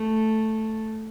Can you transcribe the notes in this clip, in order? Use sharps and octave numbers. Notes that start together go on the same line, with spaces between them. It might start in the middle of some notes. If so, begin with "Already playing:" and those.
Already playing: A3